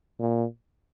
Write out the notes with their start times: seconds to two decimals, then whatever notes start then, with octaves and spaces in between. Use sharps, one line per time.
0.20 A#2